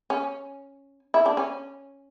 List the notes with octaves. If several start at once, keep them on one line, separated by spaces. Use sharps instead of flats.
C#4
E4
D4
C#4